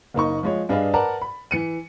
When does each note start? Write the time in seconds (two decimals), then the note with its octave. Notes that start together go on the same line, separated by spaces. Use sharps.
0.14 F#1 A#3 D#4 C#6
0.43 F3 G#3 C#5
0.69 G2 D4 G#4 B4 D#5 F5
0.94 A#4 B4 D5 F#5 A5 A#5
1.22 B5
1.51 E3 C#7 D#7